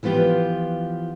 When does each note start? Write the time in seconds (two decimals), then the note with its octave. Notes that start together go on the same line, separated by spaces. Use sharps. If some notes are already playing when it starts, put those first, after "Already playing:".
0.03 E3 F3 B3 F4 G4